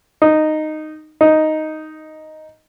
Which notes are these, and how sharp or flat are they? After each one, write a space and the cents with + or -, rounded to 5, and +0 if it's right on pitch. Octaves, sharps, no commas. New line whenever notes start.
D#4 -10
D#4 +0